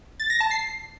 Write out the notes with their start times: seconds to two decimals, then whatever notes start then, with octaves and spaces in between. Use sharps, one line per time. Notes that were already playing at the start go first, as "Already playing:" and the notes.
0.20 A6
0.30 A#6
0.40 A5
0.51 C7